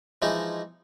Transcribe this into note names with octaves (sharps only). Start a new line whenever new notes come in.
E3 F3 G#3 D#4 F4